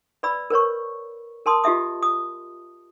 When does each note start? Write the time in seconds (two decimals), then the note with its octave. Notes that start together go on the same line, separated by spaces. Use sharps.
0.23 B4 D5 B5 E6
0.50 A#4 B4 C#5 C#6
1.46 A#4 A5 C6 D#6
1.64 F4 G4 D#5 E5 D#6
2.02 D#6